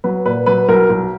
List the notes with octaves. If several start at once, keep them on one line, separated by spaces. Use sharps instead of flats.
F#3 B4
A#2 B4
F#3 B4
B1 A#4
B1